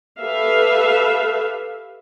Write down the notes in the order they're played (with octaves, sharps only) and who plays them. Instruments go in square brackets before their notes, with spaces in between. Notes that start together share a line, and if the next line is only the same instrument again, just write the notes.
[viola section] G4 A4 B4 E5 F5